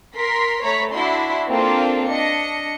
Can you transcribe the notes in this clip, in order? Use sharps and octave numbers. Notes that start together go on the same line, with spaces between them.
A#4 C6 B6
A3 C#5 A#5 B5 B6
D4 E4 F#4 E5 C6
A#3 C4 D4 F4 A4 C5
D4 D#5 C#7